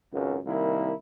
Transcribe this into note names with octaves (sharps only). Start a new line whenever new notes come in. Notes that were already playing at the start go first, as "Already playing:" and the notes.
G#1 C#2 F#2
C2 D#3 A#3 E4